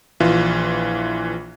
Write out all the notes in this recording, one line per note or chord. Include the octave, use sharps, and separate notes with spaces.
A#1 E3 F4